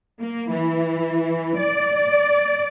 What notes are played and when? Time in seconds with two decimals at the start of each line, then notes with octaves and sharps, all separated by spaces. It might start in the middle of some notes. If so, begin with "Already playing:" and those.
0.21 A#3
0.51 E3
1.58 D5